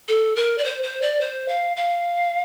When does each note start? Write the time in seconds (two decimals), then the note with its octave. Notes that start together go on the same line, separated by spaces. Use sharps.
0.08 A4
0.36 A#4
0.58 D5
0.64 C5
0.83 C5
1.02 D5
1.21 C5
1.48 F5
1.77 F5